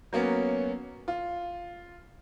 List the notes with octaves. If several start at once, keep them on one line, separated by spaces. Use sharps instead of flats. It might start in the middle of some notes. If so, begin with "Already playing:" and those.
F#3 A#3 B3 C#4
F4